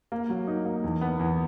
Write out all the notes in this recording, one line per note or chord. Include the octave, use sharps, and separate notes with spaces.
A#3
F#3
D#4
A#3
E2
B3
E2